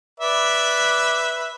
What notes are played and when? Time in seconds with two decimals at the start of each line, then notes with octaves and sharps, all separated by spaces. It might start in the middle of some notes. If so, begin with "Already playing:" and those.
0.20 B4 D5 E5